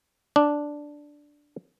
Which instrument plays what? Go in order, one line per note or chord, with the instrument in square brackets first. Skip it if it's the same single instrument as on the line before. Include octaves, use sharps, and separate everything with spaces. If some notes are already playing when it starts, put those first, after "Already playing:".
[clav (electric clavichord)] D4